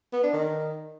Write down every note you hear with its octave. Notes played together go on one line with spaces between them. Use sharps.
B3
D4
D#3